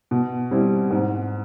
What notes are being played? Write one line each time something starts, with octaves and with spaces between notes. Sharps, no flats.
B2
G3 C4 E4
G#2